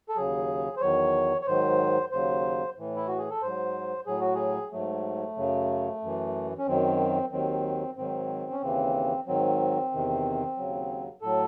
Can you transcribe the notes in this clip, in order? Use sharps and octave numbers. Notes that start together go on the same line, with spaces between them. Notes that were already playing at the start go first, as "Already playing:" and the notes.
A4
D#2 C#3 F#3 G#4
C5
E2 D#3 F#3 C#5
C#5
G#2 D#3 F#3 C5
D#2 C#3 F#3 C5
A2 E3
E4
F#4
G#4
A4
G#2 F#3 C5
A2 F#3 G#4
F#4
G#4
G#2 F#3 A3
F#2 C#3 F#3
F#2 E3
C#4
F#2 D#3 F#3 C4
D#2 D#3 F#3 C4
G#2 D#3 F#3 C4
C#4
D#2 C#3 E3 C4
G#2 D#3 F#3 C4
E2 C3 D#3
D#2 C#3 F#3
A2 F#3 A4